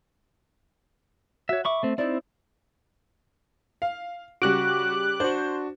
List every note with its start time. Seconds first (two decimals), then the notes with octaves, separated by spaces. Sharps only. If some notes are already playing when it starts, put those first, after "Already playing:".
1.49 F#4 C#5 E5
1.65 E5 B5 C#6 D6
1.83 A3 C4
1.98 C4 D#4 E4 D5
3.82 F5
4.42 C#3 G3 F#4 D6 F#6
5.20 D4 F#4 C5